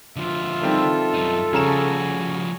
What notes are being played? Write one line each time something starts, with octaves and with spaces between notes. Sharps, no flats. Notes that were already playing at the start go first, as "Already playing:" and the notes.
D3 F3 F4 E5
D#3 G3 C4 A4
F#2 D#4
C#3 F3 G3 F#4 G#5 A#5 E7